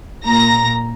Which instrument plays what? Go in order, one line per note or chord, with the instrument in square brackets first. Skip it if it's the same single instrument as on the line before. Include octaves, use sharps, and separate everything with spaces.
[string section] A#2 A#5 A#6